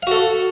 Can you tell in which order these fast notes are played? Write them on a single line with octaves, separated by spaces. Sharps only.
F5 F#4 A4